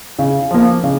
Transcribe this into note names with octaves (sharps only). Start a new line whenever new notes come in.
C#3
F3 A#3
C#3